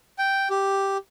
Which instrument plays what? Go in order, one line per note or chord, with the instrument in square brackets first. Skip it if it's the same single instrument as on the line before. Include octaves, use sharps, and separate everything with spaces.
[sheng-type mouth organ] G5
G4